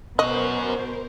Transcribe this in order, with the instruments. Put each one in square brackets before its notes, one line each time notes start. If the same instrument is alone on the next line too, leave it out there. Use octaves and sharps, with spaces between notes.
[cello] B2 [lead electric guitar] C#4 F#4 [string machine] A#4 C5 [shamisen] D#5